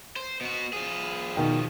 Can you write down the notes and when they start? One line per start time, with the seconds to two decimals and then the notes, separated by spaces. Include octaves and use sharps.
0.16 C5
0.41 B2 F#4
0.73 F3 G#4
1.36 B2 D#3 G5